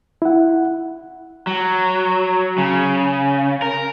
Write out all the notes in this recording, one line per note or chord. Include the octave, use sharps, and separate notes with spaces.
E4 F#5
F#3
C#3
A#4